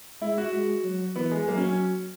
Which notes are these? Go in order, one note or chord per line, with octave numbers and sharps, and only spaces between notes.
G#3 E4
F#4
G#3
F#3
E3 B3
G#3
F#3 A#3
C#4
C#4